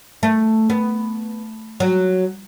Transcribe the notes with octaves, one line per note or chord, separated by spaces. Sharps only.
A3
B3
F#3